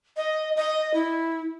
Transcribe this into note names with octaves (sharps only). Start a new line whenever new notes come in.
D#5
D#5
E4